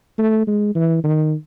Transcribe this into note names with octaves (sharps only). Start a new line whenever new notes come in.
A3
G#3
E3
D#3